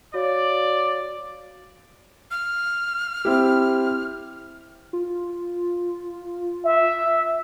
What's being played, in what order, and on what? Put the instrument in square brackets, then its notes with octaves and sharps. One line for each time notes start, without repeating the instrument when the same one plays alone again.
[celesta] F#4 C#5 F5 [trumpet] D5
[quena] F6
[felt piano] C4 E4 G4
[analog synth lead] F4
[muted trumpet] E5